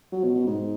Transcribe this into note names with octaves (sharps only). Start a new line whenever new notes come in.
F#3
B2
B2
G#2